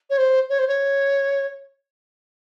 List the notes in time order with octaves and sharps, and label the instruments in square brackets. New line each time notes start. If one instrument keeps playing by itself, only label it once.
[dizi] C#5
C5
C#5
C5
C#5